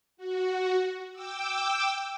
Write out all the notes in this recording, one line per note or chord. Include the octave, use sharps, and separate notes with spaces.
F#4
G5 D6 E6